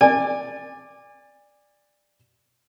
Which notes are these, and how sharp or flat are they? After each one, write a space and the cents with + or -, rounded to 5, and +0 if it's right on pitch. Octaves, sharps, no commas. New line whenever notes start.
D5 +5 G#5 -30